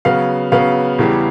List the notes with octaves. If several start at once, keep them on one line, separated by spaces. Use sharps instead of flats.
C#3 F#3 B3 F5
C#3 F#3 B3 F5
E2 C#3 E3 G3